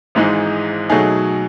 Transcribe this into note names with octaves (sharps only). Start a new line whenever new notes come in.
G#1 G#2 E3 G#3 D#4
B2 F#3 A3 D#4 G#4